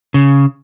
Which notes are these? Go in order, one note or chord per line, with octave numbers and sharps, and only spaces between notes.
C#3